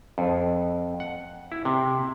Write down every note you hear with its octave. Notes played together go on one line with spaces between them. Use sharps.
F2
F#5
E4
C3